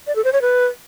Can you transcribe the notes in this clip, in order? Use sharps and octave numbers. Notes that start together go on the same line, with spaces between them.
D5
A4
C5
C#5
B4